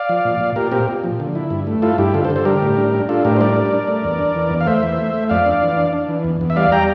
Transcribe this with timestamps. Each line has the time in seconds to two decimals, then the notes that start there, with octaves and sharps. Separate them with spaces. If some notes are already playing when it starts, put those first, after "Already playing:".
Already playing: D5 F5
0.09 F3
0.25 A#2
0.40 A#2
0.56 A#2 G4 A#4
0.71 C4 G4 A#4
0.88 A#2
1.04 F3
1.20 D3
1.35 E4
1.50 G2
1.67 A3
1.82 E4 F4 A4
1.98 G2 E4 G4
2.14 D3 F4 A4
2.25 A4 C5
2.30 D3
2.36 A4 C5
2.45 G3 G4 A#4
2.62 A2
2.77 D4
2.93 D4
3.09 D4 F4 A4
3.25 A2 G4 A#4
3.37 C5
3.41 G3 A#4 D5
3.57 D4
3.73 D4
3.88 A3
4.04 E2
4.19 D4
4.35 E3
4.51 E2
4.61 F5
4.67 A3 C5 E5
4.83 E3
4.99 A3
5.14 A3
5.29 F2 D5 F5
5.46 D4
5.62 E3
5.77 D4
5.93 D4
6.09 E3
6.24 E2
6.41 E2
6.50 E5
6.56 G3 D5 F5
6.72 G3 G5 A#5